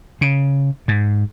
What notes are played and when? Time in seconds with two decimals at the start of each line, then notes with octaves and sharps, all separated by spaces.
0.21 C#3
0.88 G#2